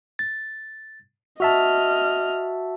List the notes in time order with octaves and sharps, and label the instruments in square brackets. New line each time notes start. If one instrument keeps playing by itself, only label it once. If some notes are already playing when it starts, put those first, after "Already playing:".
[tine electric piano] A6
[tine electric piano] F#4 E5 A5 [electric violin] D#5 F6